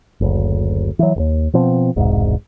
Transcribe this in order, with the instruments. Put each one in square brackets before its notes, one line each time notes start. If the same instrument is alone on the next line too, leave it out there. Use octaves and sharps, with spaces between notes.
[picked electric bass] F#1 D2
E3 F#3
E1 D#2
B2 F3 C4
E1 C2 G#2